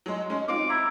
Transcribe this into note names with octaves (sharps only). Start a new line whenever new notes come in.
F#3 G#3
G#3 C#4
C4 D#4 F4 D6
E4 A#5